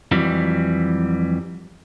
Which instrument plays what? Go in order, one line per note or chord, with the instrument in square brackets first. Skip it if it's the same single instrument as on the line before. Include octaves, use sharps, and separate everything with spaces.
[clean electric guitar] F2 E3 F#3 G3